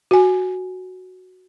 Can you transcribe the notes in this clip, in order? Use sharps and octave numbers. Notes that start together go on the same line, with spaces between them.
F#4 G#5